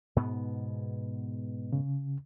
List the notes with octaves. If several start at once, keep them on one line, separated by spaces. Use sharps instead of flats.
G#2 B2 B3
C#3